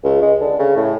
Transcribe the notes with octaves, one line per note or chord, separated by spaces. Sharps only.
C#2
G#3
D3
C#3
A2